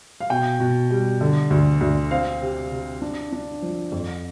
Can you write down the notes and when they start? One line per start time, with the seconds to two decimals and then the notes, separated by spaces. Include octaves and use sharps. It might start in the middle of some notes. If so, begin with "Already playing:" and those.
0.20 F5
0.30 B2 G5
0.60 B2
0.91 G3
1.21 D3
1.50 D2
1.81 D2
2.11 C4 F5
2.42 C3
2.71 C3
3.02 D4
3.32 D4
3.62 F3
3.92 F2